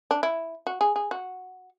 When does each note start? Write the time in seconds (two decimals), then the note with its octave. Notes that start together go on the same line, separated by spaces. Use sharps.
0.11 D4
0.23 E4
0.67 F#4
0.81 G#4
0.96 G#4
1.11 F#4